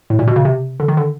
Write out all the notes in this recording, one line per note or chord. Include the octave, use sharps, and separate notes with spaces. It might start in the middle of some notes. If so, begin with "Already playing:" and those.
A2
A#2
B2
C#3
C3
D3
D#3
D3